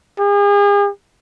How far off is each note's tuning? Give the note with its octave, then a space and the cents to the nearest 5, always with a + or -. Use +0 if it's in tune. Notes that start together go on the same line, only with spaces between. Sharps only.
G#4 -40